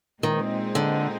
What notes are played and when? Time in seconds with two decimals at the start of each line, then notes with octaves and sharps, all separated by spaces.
0.23 A#2 D#3 G#3 C4 D#4
0.75 D3